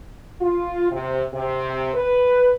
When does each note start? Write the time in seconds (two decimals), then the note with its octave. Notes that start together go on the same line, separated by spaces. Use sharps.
0.41 F4
0.92 C3
1.34 C3
1.95 B4